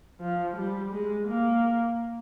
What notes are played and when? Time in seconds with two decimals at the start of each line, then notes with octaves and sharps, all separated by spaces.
0.21 F3
0.57 G3
0.93 G#3
1.28 A#3